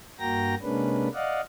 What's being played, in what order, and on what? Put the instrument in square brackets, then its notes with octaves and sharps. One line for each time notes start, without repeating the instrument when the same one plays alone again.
[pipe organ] G2 A#3 F#4 G5 A#5 A#6
C3 G#3 A#3 C#4 D4 B4
D5 D#5 F5 F#5